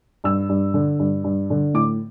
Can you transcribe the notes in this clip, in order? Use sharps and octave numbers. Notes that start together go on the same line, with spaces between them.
G2 E6
G2
D3
G2
G2
D3
A2 D6